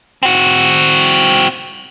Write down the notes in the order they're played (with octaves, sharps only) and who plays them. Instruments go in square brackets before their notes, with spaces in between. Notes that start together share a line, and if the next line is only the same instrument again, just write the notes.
[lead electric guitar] C4 F#4